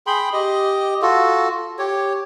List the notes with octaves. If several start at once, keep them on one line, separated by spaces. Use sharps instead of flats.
G#4 G5 B5 C6
G4 D#5
F4 F#4 A4
G4 C#5